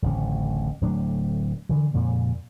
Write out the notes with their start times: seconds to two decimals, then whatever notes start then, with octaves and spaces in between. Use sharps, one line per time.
0.02 D1 A1 C#3 C#4
0.81 D1 A2 F#3 D4
1.69 D3 E3
1.94 F2 A#2 C#3